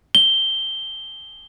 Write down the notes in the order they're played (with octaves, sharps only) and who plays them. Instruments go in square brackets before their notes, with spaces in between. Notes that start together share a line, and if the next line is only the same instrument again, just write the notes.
[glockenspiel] G7